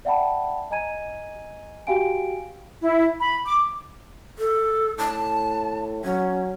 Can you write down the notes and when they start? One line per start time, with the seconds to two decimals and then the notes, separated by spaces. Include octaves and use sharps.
0.05 D5 E5 F#5 G5 A5 B5
0.71 D#5 G#5 A#5 G#6 D#7
1.87 F#4 G4 F5 G5 G#5 D7
2.80 E4
3.19 B5
3.45 D6
4.39 A4
4.98 A2 A5
6.04 F#3 C#4